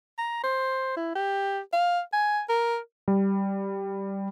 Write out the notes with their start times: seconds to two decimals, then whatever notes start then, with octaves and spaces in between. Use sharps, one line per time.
0.18 A#5
0.44 C5
0.97 E4
1.15 G4
1.73 F5
2.13 G#5
2.49 A#4
3.08 G3